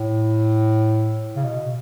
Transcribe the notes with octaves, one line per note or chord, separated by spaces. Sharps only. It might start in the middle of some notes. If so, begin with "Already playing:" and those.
Already playing: A2
C#3
B2